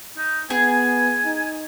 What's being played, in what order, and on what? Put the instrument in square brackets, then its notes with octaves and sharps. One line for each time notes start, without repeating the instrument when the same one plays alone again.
[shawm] D#4
[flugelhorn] B3 [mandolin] G#4 [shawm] G#5
[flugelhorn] D#4